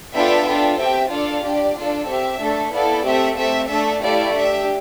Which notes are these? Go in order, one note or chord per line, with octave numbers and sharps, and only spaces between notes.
B3 D4 F4 A4 E5 G5
D4 F4 A4
C4 G4 E5 G5
D4 F4 A4 D5 F5
D4 G4 D5
D4 F4 A4
C4 G4 E5
A3 D4 A4
B3 E4 A4 D5 F5
A3 C4 G4 E5
A3 C4 G4 E5
A3 D4 A4 E5
A3 E4 G4 D5 F5
D4 G4 E5